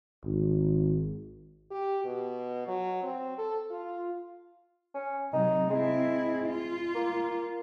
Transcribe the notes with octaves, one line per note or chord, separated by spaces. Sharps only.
G#1
G4
B2
F#3
C4
A4
F4
C#4
C3 F#3 D#4
G#3 C4 E4
F4
A#3